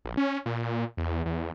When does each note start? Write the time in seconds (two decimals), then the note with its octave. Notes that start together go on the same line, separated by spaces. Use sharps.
0.05 A#1
0.17 C#4
0.46 A#2
0.97 E2
1.26 E2